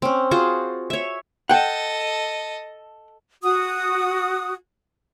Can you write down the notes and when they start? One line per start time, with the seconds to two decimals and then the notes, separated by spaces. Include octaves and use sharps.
0.02 C4 C#4
0.31 F4 F#4 G#4 C5
0.90 C#5 E5
1.49 A4 D#5 F#5 G5
3.42 F#4 D#6